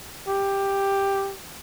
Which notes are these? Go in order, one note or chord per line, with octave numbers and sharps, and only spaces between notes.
G4